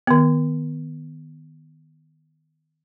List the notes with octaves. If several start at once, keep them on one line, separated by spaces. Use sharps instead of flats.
D#3 B3